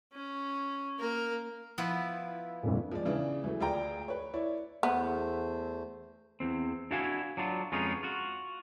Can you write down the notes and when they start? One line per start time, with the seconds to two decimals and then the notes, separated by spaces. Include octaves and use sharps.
0.13 C#4
0.99 A#3 A#4
1.78 F3 B3 E4
2.63 G1 F2 A#2
2.92 F3 G#3 D5
3.05 C#3 E3 D4
3.44 E3 F#3 A3
3.60 D2 F4 G#4 D5 G5 A#5
4.08 B4 C#5
4.34 E4 C#5 D5
4.83 E2 A3 B3 C5
6.40 E2 C4
6.91 D4 E4 F#4 F5 G#5
7.37 F#3 D4 F4
7.72 F2 G#3 B3 C#4 D#4 F4
8.03 F4 F#4